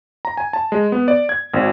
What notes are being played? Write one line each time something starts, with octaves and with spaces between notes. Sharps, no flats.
A#5
G#5
A5
G#3
B3
D5
G#6
G#1